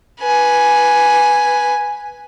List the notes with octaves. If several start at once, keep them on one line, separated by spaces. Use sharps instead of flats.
B4 G#5